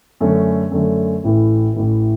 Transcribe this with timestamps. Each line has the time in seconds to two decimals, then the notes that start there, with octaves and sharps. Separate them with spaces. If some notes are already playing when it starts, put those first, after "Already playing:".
0.21 F#2 D3 A3 C#4
0.72 F#2 D3 A3 C#4
1.24 A1 A2 E3
1.74 A1 A2 E3